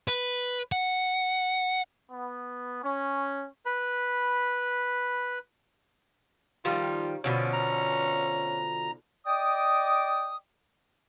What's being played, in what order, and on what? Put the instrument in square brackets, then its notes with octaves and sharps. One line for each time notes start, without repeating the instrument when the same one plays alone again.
[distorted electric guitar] B4
F#5
[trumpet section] B3
C#4
[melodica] B4 B5
[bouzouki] D#3 F3 G3 [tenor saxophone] F4
[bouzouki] B2 D3 F3 [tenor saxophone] C#4
[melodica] A#5
[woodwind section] D5 D#5 G5 D6 D#6